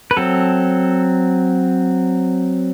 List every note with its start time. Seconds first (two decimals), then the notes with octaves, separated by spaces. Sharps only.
0.11 B4
0.17 F#3 C4 A4